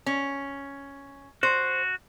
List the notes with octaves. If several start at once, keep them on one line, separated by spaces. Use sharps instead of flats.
C#4
F#4 C5